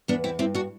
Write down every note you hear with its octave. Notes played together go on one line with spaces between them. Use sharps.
E2 B3 D4
C4 E4
G2 C4 E4
D4 F#4